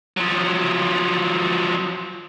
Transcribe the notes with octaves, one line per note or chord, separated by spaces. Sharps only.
F3 F#3